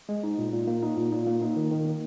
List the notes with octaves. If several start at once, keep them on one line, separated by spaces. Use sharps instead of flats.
G#3
D#4
A#2
A#2
A#3
D#4
A#2
A#2
A#3
D#4
D#3
D#3
A#3